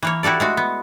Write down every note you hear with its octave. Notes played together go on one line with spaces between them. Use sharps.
E3 A#3 C#5
E4 F#4 G4 A4 D5
G#3 A3 F#4
B3